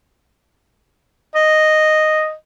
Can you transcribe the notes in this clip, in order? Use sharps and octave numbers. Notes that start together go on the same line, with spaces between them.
D#5